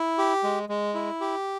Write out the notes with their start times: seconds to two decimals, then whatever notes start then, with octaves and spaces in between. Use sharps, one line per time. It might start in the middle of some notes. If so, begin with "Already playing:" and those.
Already playing: E4
0.18 G4
0.44 G#3
0.69 G#3
0.94 E4
1.21 G4